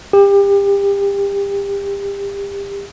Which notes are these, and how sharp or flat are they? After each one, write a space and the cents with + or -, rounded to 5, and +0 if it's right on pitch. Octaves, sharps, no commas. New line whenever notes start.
G4 +30